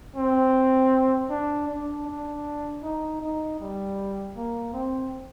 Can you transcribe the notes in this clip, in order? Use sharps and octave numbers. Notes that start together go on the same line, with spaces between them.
C4
D4
D4
D4
D#4
D#4
G3
A#3
C4